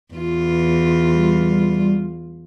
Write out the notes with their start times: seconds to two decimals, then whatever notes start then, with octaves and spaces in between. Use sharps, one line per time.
0.14 E2 F4
1.13 G3